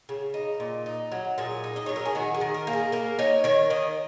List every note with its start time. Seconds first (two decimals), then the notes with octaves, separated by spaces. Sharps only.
0.09 C#3
0.34 D#4
0.60 A#2
0.86 D#4
1.12 F#3
1.38 A#2 G#4
1.64 D#4
1.76 D#5
1.86 F#3 C#5
1.96 A#4
2.05 G#4
2.15 D#3 F#4
2.34 G#4
2.41 D#3
2.54 A#4
2.67 A#3
2.73 G#4
2.92 A#3 A#4
3.19 D#4 C#5
3.44 D#3 C#5
3.70 D#3 D#5